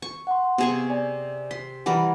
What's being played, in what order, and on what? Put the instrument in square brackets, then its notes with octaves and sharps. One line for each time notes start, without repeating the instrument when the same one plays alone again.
[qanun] C#6
[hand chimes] F#5 C6
[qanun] C3 G#4 C#6 [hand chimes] B3
[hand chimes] D5 G#5
[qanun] C6 [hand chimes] B6
[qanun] E3 G3 A#4 [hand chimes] F#5